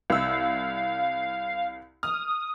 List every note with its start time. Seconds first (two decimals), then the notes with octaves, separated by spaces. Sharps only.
0.10 C2 F5 E6
2.03 D#6 F6